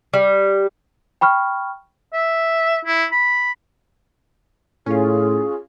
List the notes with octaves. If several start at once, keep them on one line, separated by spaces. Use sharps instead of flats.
G3
G5 B5 C#6 F6
E5
E4
B5
A2 C#4 F4 G#4